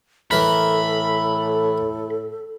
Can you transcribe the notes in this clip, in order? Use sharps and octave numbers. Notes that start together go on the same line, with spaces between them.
A2 E3 A4 A#4 B5